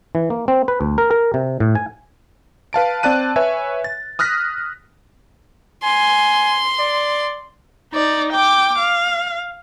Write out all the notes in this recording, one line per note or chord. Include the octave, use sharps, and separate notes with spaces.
E3
A#3
C4
B4
D2
A#4
A#4
C3
A2
G#5
B4 F5 A5 D7
C4 D5 A5 F#6 D#7
B4 C#5 E5 G#5
A6
D#6 F6 F#6 A#6 B6
G#5 C6
D5
D#4 D5
G5 D6
F5